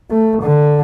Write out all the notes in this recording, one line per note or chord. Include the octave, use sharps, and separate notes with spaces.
A3
D3